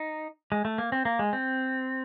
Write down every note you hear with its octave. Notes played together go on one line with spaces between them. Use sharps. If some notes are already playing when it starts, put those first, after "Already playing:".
Already playing: D#4
G#3
A3
A#3
C4
A#3
G#3
C4